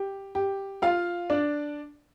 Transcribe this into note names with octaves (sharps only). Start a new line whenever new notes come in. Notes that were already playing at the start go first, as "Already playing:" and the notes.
Already playing: G4
G4
F4 F5
D4 D5